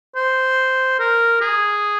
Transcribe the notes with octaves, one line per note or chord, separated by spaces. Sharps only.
C5
A#4
G#4